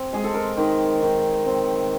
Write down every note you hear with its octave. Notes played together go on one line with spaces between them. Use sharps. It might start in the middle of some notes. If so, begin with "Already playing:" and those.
Already playing: C4
G#3 G#4
A4
A#4
D#3
D#3
C4